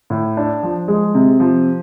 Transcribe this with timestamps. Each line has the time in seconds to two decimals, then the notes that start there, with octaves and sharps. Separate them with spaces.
0.10 A2
0.37 D4
0.63 F3
0.88 G#3
1.15 C3
1.40 F3